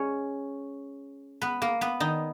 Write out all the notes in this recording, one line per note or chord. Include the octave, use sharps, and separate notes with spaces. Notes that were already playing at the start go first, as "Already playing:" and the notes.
Already playing: G#3 C#4 C#5
B3 B4
A#3 A#4
B3 B4
D#3 D#4